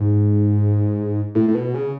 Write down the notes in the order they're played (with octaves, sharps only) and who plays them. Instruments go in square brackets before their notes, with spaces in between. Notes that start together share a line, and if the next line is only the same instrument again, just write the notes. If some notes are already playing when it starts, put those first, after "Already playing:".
Already playing: [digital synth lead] G#2
A2
A2
B2
C#3